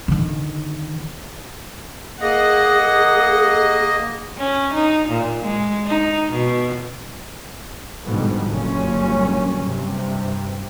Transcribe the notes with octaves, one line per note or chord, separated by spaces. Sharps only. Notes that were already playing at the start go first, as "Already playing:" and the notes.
D3 D#3
A#3 G#4 D#5 F#5
C#4
D#4
A#2
G#3
D#4
B2
G#2 B2 D3 F3 G3
F#1 A#2 D3 G3 C#4
G2 C3